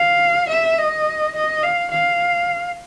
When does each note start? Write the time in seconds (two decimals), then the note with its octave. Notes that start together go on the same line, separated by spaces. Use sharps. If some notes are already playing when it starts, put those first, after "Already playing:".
Already playing: F5
0.49 E5
0.78 D#5
1.35 D#5
1.63 F5
1.91 F5